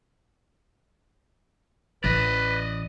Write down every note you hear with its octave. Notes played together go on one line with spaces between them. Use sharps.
A1 B4 D5 D#5